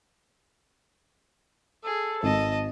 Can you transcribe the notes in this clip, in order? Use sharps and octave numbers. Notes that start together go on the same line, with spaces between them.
G#4 A4
G#1 D#5 A5